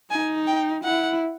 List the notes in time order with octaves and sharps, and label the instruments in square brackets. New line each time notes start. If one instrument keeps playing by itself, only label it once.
[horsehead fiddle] D#4 [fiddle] G#5
[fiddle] G5
[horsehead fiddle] E4 [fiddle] F#5